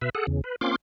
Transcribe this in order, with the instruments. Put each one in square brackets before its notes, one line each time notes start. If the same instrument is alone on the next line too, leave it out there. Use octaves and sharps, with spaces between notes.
[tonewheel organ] B2 B4 E5
G#4 A4 F#5
E2 C#3
B4
A#3 C4 C#4 F4 C6 D6